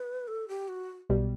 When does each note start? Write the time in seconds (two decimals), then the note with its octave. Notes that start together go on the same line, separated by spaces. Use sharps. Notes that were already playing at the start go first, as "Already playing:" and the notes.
Already playing: B4
0.28 A4
0.48 G4
0.69 F#4
1.10 B1 B2 G3